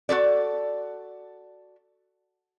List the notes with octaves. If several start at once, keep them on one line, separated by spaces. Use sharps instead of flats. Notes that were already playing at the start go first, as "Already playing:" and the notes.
F#4 G#4 A4 D5